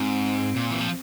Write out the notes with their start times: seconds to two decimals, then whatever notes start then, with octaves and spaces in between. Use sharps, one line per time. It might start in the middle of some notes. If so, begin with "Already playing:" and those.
Already playing: G#2 C4
0.56 A#2
0.71 E3
0.80 F3